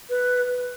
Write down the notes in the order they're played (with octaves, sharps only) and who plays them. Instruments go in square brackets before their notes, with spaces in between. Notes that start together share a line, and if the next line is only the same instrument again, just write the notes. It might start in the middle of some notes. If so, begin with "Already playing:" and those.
[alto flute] B4